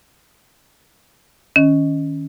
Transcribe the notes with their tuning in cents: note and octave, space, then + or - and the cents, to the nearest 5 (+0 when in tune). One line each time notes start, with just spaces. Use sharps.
D#3 +0 C#4 +5 D#5 +5